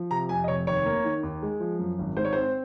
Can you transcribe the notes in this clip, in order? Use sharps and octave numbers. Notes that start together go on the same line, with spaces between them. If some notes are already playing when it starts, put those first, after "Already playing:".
Already playing: F3
C3 A#5
F2 G#5
D#5
F1 C#5
D#2 C#5
A#3
D#3
D#2
G#3
F3
F#2
G#1
G#2 C5
C#5
C4 C5